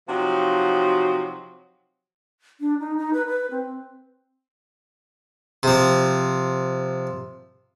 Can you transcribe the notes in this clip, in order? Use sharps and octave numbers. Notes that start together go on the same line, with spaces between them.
C3 F3 F#3 D#4 F#4
D4
D#4
D#4
B4
B4
C4
C3 F3